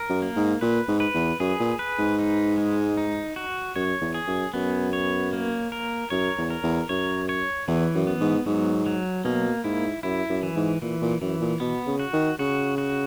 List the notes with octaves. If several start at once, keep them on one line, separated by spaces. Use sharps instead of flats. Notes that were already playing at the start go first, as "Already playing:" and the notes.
Already playing: A#4
F#2
A#3
G#2
A#2 B4
G#2
B4
E2
F#2 G#4
A#2
B4
G#2
D#4
G#3
D#4
F#4
F#2 C#5
E2
G#4
F#2
F#2 B3
C#5
A#3
A#4
F#2 C#5
E2
A#4
E2
F#2 C#5
C#5
E2 E3
F#2
B3
G#2
G#2 F#3
F#3
B2 A#3
G#2 E4
F#2 E4
F#2
E3
G#2
A#2 E3
A#2
F#2 E3
A#2
B2 B3
C#3
F#4
D#3
C#3 F#4
F#4